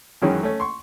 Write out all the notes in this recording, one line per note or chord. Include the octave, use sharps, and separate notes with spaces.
F#2 D#3 E3 F#3 G#3 C#4
A3 C#4
C6 C#6